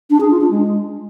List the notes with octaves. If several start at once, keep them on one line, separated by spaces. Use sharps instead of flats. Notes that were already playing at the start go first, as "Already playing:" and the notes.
D4
G#4
F4
D4
G#3